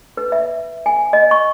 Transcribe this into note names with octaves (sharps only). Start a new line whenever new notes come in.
B4
E5
G#5
D#5
C#6